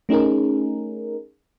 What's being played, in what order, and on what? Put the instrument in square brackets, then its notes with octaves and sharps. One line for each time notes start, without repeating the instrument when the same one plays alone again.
[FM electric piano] A3 C#4 D#4 G#4 A#4